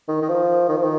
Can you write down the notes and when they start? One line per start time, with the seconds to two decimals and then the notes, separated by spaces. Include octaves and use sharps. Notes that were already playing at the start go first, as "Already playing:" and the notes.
0.08 D#3
0.22 D#3
0.29 F3
0.69 D#3
0.76 F3
0.83 D#3